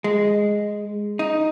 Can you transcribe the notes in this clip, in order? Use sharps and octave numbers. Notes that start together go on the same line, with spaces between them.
G#3
D#4